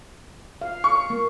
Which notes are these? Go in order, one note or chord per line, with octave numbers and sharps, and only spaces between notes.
F5
C#6
A#3